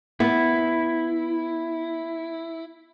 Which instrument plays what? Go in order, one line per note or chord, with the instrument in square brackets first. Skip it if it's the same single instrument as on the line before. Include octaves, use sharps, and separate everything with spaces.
[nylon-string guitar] B3 [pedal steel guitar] E4